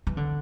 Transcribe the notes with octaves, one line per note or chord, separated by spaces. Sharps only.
E3
D3